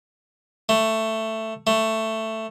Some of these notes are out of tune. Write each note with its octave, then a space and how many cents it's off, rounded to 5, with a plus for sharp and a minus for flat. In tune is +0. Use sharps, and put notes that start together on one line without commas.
A3 +10
A3 +10